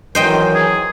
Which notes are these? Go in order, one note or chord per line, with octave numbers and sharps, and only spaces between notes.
D#3 E3 F#3 C5 D#5 G5
G#4